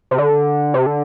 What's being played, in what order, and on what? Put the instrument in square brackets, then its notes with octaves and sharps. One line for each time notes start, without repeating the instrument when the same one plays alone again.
[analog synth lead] C3
D3
C3
D3